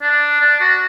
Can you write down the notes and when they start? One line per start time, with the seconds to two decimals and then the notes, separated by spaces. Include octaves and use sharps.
0.02 D4
0.41 D4
0.60 F#4